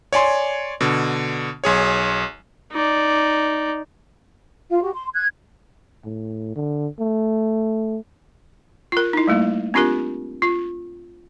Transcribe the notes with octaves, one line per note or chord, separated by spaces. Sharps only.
C#5 D5 G#5 C6
B2 D3
B1 G#4 C#5
D#4 D5
F4 F5
F#4 G4
C6
F#6 G#6
A2
D3
A3
F4 A#4
D#4 E4
G3 A3 A#3
C4 D4 F4 G4 A#4
F4